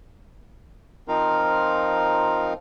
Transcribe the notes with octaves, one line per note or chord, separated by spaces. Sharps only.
F3 C4 D#4 F4 A#4 F5